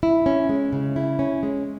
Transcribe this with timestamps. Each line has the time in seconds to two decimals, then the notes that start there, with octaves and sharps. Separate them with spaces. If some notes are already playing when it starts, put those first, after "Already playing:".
0.03 E4
0.26 C#4
0.49 G#3
0.73 C#3
0.96 E4
1.19 C#4
1.43 G#3